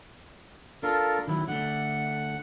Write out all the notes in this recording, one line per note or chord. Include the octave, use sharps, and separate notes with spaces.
D4 F4 A4 A#4
D#3 F#3 E4
D3 A3 F#5